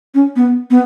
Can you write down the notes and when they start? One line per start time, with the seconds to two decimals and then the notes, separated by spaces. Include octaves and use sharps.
0.15 C#4
0.36 B3
0.71 B3